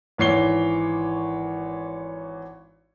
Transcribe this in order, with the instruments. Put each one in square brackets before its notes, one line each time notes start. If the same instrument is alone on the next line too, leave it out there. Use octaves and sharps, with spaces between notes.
[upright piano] G#1 E3 C#5 C7 G7